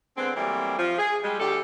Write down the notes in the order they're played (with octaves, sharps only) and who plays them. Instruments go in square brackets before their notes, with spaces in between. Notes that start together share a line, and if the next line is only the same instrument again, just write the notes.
[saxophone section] D3 G#3 B3 C4
E3 F#3 G3 A3 A#3 C4
F3
G#4
G3 G#3
D2 G4 A4